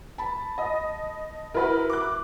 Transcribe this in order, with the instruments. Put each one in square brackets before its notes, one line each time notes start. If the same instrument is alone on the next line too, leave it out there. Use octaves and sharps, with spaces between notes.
[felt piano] A5 B5
[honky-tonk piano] D#5 D#6
[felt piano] E4 F#4 [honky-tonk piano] A#4 B4
[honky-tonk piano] D6 F#6